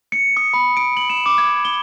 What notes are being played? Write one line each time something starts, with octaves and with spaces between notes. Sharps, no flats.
C#7
D#6
B5
D7
F#7
E7
D6
G#6
G7